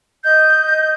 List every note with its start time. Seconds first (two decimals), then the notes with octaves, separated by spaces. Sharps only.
0.24 D#5 G6